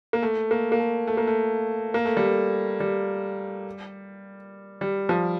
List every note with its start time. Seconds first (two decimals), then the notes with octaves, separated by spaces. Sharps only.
0.13 A#3
0.22 A3
0.51 A#3
0.72 A#3
0.80 A3
1.07 A3
1.17 A#3
1.27 A3
1.94 A#3
2.05 A3
2.17 G3
2.27 A3
2.80 G3
4.81 G3
5.09 F3